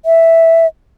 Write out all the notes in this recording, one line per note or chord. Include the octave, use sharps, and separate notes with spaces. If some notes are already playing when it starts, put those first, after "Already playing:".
E5